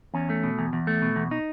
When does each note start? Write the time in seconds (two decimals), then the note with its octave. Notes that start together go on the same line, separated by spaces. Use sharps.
0.14 E2 C#4
0.30 A3
0.43 B2
0.59 E2
0.73 E2
0.87 A3
1.02 B2
1.16 E2
1.31 D#4